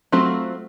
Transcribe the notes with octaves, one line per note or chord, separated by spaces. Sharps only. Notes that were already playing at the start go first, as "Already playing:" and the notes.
F#3 A3 C4 F4 F#4